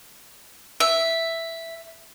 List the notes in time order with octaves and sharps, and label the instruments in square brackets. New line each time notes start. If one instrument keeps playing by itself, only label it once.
[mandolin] E5